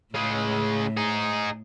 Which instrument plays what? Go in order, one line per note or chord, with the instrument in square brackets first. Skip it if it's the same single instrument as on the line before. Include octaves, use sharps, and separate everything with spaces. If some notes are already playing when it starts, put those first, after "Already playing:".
[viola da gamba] A2 [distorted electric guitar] C#3 G#3
[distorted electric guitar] D#4 G#4